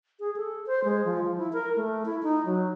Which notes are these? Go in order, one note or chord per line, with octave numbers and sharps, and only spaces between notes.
G#4
A4
C5
G#3
F3
F3
E4
A#4
A3
E4
D#4
F#3